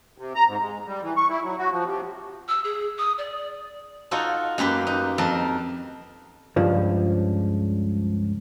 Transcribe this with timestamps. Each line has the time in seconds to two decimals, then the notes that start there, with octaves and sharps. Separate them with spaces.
0.18 C3
0.35 A#5
0.47 G#2
0.61 G#3
0.86 G3
1.02 E3
1.17 C#6
1.29 E4
1.43 F#3
1.58 F#4
1.70 F3
1.84 C3
2.48 E6
2.64 G#4
2.98 D#6
3.18 D5
4.11 D#4 F4 F#4 A4
4.58 F#2 A#3 G4 B4
4.87 D#4
5.18 F2 A#4 A5
6.56 C#2 G2 F3